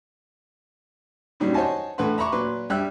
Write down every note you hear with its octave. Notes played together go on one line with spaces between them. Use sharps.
F#2 A#2 D#3 F#3 G3
C5 C#5 D#5 F#5 G#5 A5
A2 E3 A3 B4 F#5 C6
E5 A#5 B5 C#6 D6
A#2 F#3 B4 C6
G2 G3 E5 G5 E6 F#6